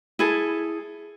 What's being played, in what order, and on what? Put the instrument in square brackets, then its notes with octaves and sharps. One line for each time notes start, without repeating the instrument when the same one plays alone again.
[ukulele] E4 G#4 A4